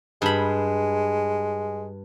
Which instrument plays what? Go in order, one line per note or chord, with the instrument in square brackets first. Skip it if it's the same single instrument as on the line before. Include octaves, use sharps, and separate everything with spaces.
[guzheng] G2 B5 [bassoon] G#3